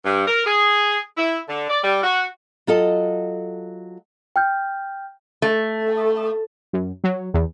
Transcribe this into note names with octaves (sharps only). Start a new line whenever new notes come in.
G2
A#4
G#4
E4
D3
D5
G3
F#4
F#3 F4 A4 D#5
G5 F6 G6
A3
F#2
F#3
E2